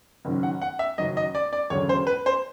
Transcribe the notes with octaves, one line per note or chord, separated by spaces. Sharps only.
F#1 F#2 D#3 F#3
F#5
F#5
E5
F#1 F#2 D#3 F#3 D#5
D#5
D5
D5
E1 D2 C#3 F#3 C#5
C5
B4
C5